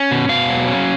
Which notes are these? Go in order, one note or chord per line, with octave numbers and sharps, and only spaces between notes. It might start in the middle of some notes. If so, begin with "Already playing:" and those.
Already playing: C#4
B2
B2 F5
F#3
C#4